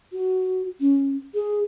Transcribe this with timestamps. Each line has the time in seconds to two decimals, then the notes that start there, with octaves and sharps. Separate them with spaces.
0.13 F#4
0.80 C#4
1.35 G#4